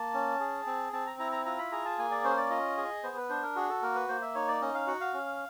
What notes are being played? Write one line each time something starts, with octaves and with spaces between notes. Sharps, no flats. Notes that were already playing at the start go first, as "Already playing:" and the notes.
Already playing: A#3 A5
C#4
G#4
C4
C4 A5
A#5
E4 A#5
A#5
F4 A#5
B5
G#4 A#5
A5
A#3 G#5
D5
C#4 C5
D5
F4 D#5
G#4
B3 C5
B4
D4 C5
A#4
F#4 G#4
A4
A#3 A#4
B4
A#3 C5
E5
D#4 C#5
D5
C#4 D#5
F5
F#4 F#5
F5
C#4